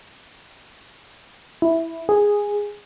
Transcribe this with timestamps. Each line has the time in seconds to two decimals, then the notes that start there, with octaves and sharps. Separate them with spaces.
1.62 E4
2.09 G#4